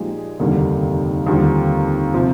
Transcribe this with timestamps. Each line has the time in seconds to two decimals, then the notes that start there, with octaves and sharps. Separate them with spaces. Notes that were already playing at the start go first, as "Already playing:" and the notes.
Already playing: A#2 F3 G#3 D#4 G4
0.40 F1 D#2 D3 G3 A#3
1.27 D#2 D3 G3 C4 F4
2.14 C3 F3